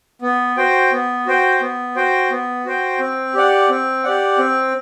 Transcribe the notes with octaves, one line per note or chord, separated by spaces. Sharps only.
B3
F#4 C5 G5
B3
F#4 C5 G5
B3
F#4 C5 G5
B3
F#4 C5 G5
C4
G4 D5 F#5
C4
G4 D5 F#5
C4